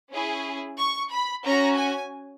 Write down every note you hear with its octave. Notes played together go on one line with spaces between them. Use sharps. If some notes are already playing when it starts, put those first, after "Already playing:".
C#4 E4 G#4
C#6
B5
C#4 F#4 A#5
G#5